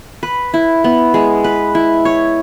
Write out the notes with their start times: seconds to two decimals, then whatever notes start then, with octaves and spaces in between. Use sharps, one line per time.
0.23 B4
0.54 E4
0.84 B3
1.14 G#3
1.44 B4
1.75 E4
2.05 C#5